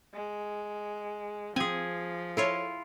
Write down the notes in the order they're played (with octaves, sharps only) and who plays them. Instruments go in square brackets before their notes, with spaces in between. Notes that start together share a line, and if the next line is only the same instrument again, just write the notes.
[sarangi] G#3
[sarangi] F3 [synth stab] C4 [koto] G#4 G#5
[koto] E4 F4 [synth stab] A4 C#5